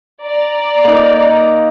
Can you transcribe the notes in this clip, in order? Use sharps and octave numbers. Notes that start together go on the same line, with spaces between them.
D5 A#5
A#3 D#4